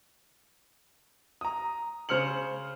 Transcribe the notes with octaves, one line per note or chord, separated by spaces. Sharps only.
A#5 D#6
C#3 C5 F6 C#7 F#7